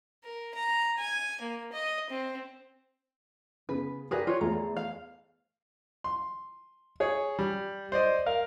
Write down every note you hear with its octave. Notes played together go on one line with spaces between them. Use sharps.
A#4
A#5
G#5
A#3
D#5
C4
C#3 B3 B4
G4 G#4 A#4 B4 D5
F4 B4 C#5
E2 A3 G#4 A#5
F5
C6
G#4 C#5
G3
C5 D5 D#5
A#4 F5